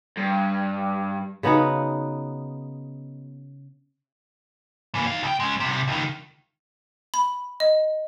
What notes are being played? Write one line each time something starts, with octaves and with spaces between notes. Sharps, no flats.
G2
C#3 B3 D#4 F#4
E3 A#3
D#4 F5
C#2 G5
G#3 C#4
C2 C3
C#2 D#3
B5
D#5